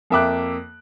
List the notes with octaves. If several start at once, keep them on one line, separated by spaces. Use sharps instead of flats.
F2 A#3 E5 G5 D6 F#6